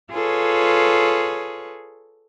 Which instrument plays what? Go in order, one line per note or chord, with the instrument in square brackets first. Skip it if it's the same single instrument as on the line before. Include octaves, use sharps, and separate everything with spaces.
[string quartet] F4 G#4 A4 B4 C#5